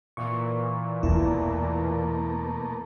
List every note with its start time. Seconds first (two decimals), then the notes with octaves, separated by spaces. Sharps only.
0.17 A#2 E3 C#6
1.03 E2 B2 A3 A#3 E4